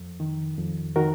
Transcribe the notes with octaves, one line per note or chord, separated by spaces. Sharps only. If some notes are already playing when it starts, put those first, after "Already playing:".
Already playing: F2
D#3
F2
D#3 F#4 A#4